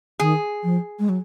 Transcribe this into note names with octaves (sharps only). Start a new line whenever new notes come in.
D#3 G#4
F3
G#3
F#3